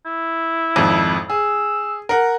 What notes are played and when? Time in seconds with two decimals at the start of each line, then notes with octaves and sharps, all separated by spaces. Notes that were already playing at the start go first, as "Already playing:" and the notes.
0.06 E4
0.76 G#1 F2
1.30 G#4 E6
2.09 A#4 F#5